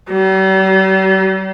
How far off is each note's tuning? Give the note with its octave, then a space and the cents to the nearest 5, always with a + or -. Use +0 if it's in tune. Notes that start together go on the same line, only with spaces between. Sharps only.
G3 -45